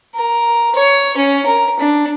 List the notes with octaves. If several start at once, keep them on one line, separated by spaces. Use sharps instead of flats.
A#4
C#5
C#4
A#4
D4